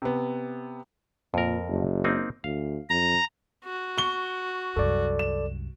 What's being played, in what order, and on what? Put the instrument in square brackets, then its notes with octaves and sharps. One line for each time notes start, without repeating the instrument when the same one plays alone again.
[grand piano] C3 B3
[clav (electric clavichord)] F2 A#4 [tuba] A#2
[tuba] F#1
[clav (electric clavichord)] A#3 C4 D#4
[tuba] D2 [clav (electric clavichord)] F5
[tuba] F2 [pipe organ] A#5
[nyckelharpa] F#4
[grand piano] C#6 G7
[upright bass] C2 F#2 [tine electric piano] A4 D5
[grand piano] E7